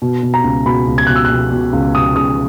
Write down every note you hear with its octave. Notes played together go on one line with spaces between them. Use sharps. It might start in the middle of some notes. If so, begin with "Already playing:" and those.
B2
B2
A#5
C#2
B2 B5
C#2
G#6
B2 F#6
E6
F#6
B2
B2
C#2
B2 D#6
C#2 D#6